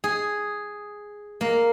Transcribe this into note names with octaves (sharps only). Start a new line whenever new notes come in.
G#4
A#3